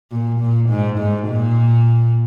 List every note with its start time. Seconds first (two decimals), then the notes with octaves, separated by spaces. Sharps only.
0.12 A#2
0.40 A#2
0.69 G#2
0.98 G#2
1.27 A#2